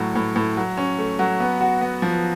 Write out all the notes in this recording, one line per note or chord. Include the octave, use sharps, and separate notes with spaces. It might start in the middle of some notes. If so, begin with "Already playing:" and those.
Already playing: A2 F#3
A2
A2
F#3
C#4
A3
F#3
B3
F#4
B3
F3